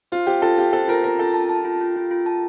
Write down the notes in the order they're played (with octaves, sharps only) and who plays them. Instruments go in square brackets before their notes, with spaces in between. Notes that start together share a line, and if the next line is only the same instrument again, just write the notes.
[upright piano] F4 [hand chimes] C5
[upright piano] G4 [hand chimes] C5
[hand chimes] F4 [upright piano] A4
[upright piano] G4 [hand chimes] F5
[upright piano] A4 [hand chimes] C5
[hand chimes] F4 [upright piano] A#4
[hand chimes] F4 [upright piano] A#4
[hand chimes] F4 [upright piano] A4
[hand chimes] A5
A5
F4
F4
F4
F4
A5